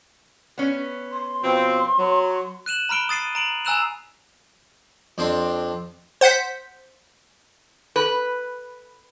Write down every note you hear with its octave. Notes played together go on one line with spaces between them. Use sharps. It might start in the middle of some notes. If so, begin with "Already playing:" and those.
B3 C#4
C6
B2 F3 C4
F#3
F#6 D#7 E7 F#7
A#5 B5 F6 D7 G7
D#6 A6 C7 D#7
A#5 D7 F#7
G#5 A#5 E6 F#6 E7 F7
F2 C4 D4 C6
C5 F#5 G6 B6
B4